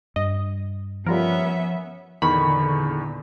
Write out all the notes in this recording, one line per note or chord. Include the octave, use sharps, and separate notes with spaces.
G2 D#5
F3 G3 B3 C#4 F4 A#4 E5
E2 A#2 D3 D#3 B5 C#6